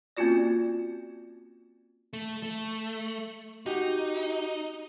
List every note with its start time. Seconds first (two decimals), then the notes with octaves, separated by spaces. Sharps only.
0.17 A#3 C4 C#4 F4 F#4 D5
2.13 A3
2.43 A3
3.66 D#4 F#4 G4